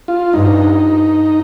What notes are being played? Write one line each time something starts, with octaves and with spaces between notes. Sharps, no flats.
F4
G2 D#4